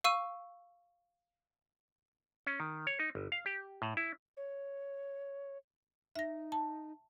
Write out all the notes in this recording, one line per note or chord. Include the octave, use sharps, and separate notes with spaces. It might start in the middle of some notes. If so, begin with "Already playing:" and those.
F5 C#6 E6 D#7
C#4
D#3
C#5
D#4
G1
F5
G4
A2
E4
C#5
D#4 E5 A#6
A5